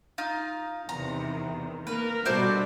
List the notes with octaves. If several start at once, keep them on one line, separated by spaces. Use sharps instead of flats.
D#4 F4
E2 C3 D#3 A#5
A#3 A#4 B4
B2 G3 D4 F#4 A4 C5 D5 E5